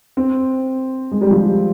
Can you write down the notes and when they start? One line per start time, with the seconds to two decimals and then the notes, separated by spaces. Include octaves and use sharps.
0.17 C4
1.12 G#3
1.21 G3
1.31 F3
1.40 G3